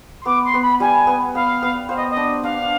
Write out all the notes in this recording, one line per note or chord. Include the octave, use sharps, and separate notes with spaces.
C6
B3 D6
C6
B3
B5
G3 G#5
B3
B3 F5
B3
C5 F5
D#5
D#5
D4
D4 F5